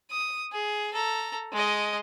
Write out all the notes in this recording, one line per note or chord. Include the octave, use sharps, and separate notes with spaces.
D#6
G#4
A4 A#5
G#3 D#5